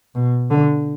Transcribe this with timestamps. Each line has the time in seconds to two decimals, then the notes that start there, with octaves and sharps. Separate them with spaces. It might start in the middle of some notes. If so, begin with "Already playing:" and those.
0.15 B2
0.50 D3